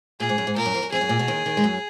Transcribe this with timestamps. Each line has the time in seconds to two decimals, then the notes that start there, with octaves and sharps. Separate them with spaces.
0.20 A#2 G#4
0.29 G#2
0.38 F#2
0.47 G#2
0.56 A#2 A#4
0.66 F#2
0.74 F2
0.83 F#2
0.92 F2 G#4
1.01 F#2
1.09 A#2
1.19 B2
1.28 D#2 D#3
1.46 D#2 D#3
1.57 G#3
1.64 F#2 F#3